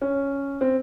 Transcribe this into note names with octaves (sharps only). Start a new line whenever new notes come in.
C#4
C4